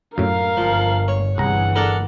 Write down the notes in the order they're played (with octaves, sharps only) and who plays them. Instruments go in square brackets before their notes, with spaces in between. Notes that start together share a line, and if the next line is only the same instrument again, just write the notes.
[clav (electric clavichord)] F#2 A2 [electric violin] A#4 F5
[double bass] G1 [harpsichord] F3
[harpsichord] C#5
[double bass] G1 E3 [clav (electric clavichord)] C2 A#5 [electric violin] G#4 F#5
[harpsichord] D4 A4 A#4